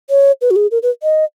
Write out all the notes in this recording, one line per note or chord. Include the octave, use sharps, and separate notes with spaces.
C#5
B4
F#4
G#4
A#4
B4
D#5